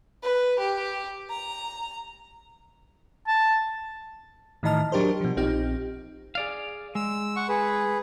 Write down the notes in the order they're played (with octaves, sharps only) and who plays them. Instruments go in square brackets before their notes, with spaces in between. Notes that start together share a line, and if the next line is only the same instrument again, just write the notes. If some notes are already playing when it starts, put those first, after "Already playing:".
[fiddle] B4
G4
A#5
[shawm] A5
[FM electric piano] A2 D#3 E3 D#5 A5 F6
F#3 D4 G4 A#4 C5
B2 F3
A#1 C4 D#4 G4 F6
[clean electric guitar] G#4 D5 F5
[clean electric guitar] G#3 [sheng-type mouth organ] E6
[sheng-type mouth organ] F#5 C#6
G#4 B4